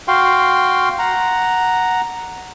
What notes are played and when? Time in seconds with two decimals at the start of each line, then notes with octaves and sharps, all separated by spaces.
0.08 F#4 F5 G5 C6
0.99 F#5 A#5